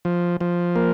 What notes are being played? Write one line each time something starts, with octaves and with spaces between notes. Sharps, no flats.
F3
F3
A#3